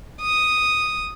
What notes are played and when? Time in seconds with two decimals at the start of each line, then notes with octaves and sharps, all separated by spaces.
0.22 D#6